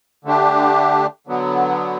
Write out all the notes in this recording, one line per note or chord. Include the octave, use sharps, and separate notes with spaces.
D3 A3 D4 G4
D3 F#3 B3